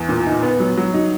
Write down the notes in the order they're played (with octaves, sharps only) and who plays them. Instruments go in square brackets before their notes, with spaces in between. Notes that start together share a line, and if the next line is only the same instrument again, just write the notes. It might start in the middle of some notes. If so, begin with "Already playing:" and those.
Already playing: [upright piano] E2
A#2
D#4
B3
F#3
F#3
D#4